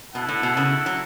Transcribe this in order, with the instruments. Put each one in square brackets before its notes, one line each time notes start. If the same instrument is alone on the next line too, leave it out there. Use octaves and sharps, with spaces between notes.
[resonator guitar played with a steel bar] B2 [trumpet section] E4 A4 F#5
[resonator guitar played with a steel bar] A2
B2
C#3
F#3